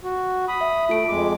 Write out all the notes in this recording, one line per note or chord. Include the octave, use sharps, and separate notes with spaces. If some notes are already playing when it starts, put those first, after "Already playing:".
F#4
B5 D#6
E5
A3 F4 D7
F2 G#3 D6